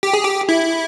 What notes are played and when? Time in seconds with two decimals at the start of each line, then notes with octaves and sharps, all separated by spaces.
0.03 G4
0.13 G#4
0.24 G4
0.49 E4